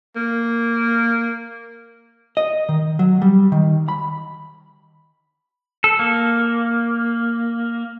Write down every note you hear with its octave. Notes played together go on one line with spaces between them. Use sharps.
A#3
D#5
D#3
F#3
G3
D#3
B5
A4
A#3